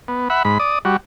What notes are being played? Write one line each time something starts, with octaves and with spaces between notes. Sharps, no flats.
B3
E5 F#5 B5
G#2 B5
D5 D#6
G3 F#4